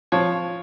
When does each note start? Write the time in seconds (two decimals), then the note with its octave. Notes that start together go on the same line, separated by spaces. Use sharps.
0.12 F3 C#5